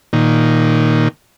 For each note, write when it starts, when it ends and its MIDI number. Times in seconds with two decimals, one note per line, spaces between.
0.13 1.08 46
0.13 1.08 51